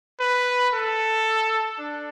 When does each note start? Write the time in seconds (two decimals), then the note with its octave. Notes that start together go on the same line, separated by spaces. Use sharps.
0.20 B4
0.73 A4
1.79 D4